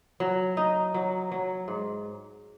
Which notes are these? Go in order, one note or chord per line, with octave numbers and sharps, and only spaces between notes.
F#3
D#4
F#3
F#3
G#2